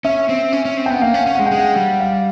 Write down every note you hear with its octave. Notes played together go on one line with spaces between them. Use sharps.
C#4 E5
C4
C#4
C#4
C4
G5
B3 F#5
A#3 F5
C#4
F#5
C#4
G#3 F#5
G5
G#3
F#5
G3
F5